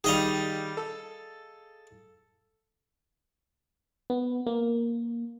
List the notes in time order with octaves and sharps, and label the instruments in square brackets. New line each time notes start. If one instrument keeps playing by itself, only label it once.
[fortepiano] D#3 G3 [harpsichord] G#4 D#5 F5
[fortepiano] A4
[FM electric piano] B3
A#3